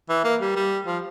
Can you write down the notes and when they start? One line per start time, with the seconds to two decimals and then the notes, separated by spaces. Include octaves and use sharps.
0.09 E3
0.24 A#3
0.41 G3
0.56 G3
0.87 F3